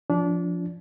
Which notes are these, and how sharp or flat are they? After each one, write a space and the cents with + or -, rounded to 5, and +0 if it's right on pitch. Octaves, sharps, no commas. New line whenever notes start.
F3 +0 D4 -25 F4 +0